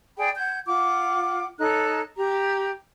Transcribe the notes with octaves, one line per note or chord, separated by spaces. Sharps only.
G#4 D5 G5 B5
F#5 G6 G#6
F4 F#5 D6
D#4 A4 C#5 F#6
G4 A#5